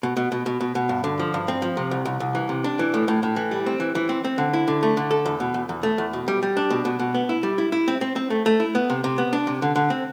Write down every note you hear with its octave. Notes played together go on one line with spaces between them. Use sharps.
B2
B2
B2
B2
B2
B2
G2
D3
F3
G2
C4
F3
C3
C2
C2
C2
E3
C3
D4
E3
A2
A2
A2
E3
G3
C4
E3
E3
C4
C4
D3
E4
D3
A3
D3
A4
E2
B2
E2
E2
A3
E2
B2
G3
G3
D4
B2
B2
B2
B3
E4
G3
E4
E4
C4
C4
C4
A3
A3
E4
B3
C3
C3
B3
D4
C3
D3
D3
C4